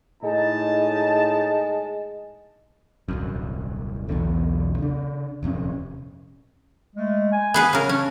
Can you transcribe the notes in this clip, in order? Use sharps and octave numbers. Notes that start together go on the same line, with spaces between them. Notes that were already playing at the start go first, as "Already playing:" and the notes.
A2 G#3 D#4 A5
D#1 C2 F#2
B1 E2 B2 D3
C#3 D4
D#1 F2 C3 C#4
G#3 A3
G#5
B3 G#4 B4
C#3 F#3 A#4 F6
C#4 D4